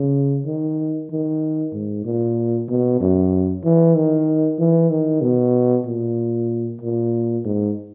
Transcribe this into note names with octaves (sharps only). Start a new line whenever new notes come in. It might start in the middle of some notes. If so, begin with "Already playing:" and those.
Already playing: C#3
D#3
D#3
G#2
A#2
B2
F#2
E3
D#3
E3
D#3
B2
A#2
A#2
G#2